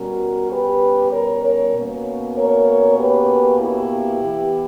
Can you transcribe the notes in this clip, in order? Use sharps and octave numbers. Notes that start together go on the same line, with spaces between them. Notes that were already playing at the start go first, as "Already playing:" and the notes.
Already playing: B2 G3 C#4 F#4 A#4
G4 B4
A#4 C#5
A#4 C#5
B2 A#3 C#4
A#4 C#5
G4 B4
E4 G4
E3 B3